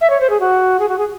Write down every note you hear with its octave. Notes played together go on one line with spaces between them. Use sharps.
E5
C#5
C5
G#4
F#4
G#4
F#4
G#4